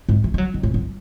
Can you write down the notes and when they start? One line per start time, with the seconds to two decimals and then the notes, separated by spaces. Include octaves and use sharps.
0.09 G#2
0.24 E3
0.34 G#3
0.38 F#3
0.54 D#3
0.63 A2
0.74 F#2